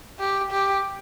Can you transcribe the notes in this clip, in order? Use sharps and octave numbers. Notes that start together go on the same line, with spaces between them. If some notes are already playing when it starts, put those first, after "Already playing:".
G4
G4